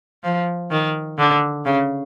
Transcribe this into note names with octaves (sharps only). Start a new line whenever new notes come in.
F3
D#3
D3
C#3